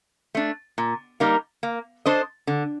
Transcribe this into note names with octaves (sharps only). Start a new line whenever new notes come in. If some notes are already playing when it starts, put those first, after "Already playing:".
A3 D4
A#2
G3 A#3 D#4 A#4
A#3
D4 A4 C5 D#5
D3